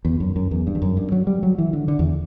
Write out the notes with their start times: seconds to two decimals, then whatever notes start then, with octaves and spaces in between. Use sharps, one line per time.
0.05 E2
0.20 F#2
0.36 F#2
0.51 E2
0.67 G2
0.75 E2
0.82 F#2
0.97 G2
1.12 F#3
1.27 G3
1.43 F#3
1.58 E3
1.73 D3
1.88 D3
1.99 E2